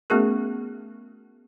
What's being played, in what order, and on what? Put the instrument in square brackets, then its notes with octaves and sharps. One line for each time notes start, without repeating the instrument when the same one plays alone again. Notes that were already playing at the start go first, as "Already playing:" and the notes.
[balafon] A3 B3 C#4 F#4 G#4 A#4